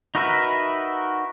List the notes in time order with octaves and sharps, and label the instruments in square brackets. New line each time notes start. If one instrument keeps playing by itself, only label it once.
[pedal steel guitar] D#4 F#4 A#4 B4 E5